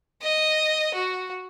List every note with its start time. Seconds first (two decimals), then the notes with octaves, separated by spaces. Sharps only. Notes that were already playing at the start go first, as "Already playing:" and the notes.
0.22 D#5
0.94 F#4